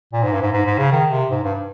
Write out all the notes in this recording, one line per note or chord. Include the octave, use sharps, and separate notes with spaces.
A#2
G#2
G2
G#2
G#2
G#2
C#3
D#3
C3
G#2
G2